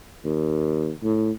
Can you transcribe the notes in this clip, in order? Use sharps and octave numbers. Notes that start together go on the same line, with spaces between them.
D#2
A2